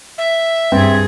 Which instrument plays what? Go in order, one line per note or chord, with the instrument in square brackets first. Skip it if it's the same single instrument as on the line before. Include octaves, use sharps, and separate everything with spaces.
[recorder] E5
[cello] G2 G#4 [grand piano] C4